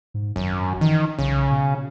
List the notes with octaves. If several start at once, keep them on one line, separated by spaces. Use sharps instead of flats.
G#2
G#1 F#2
D#3 E3
B1 C#3
B2